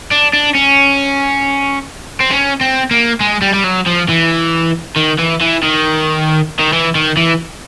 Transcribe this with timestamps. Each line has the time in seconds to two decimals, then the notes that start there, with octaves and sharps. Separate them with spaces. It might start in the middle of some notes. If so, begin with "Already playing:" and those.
0.11 D4
0.33 D4
0.55 C#4
2.20 C4
2.31 C#4
2.61 C4
2.91 A#3
3.21 G#3
3.42 G3
3.54 G3
3.64 F#3
3.86 F3
4.09 E3
4.96 D#3
5.18 E3
5.41 E3
5.63 D#3
6.59 D#3
6.73 E3
6.95 D#3
7.17 E3